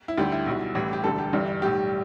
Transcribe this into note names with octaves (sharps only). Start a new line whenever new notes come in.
E4
D2 D3 G3 G4
E4
B1 B2 G3
A1 A2 E3 G3
G4
E1 D2 D3 G3 A4
G4
G1 G2 E3 G3
B1 A2 G3 G4